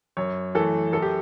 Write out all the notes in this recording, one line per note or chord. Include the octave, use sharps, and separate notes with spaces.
F#2 C#5
E3 A3 A4
F#2 A4
G4